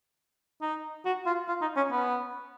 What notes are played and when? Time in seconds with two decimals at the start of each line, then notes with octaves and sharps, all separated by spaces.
0.61 D#4
1.05 F#4
1.26 F4
1.48 F4
1.62 D#4
1.76 C#4
1.91 B3